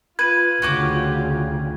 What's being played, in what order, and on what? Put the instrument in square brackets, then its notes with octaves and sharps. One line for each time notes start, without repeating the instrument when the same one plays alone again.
[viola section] F4 [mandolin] B4 [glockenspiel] G#6 D#7
[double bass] D2 C#3 [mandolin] F#4 G4 D6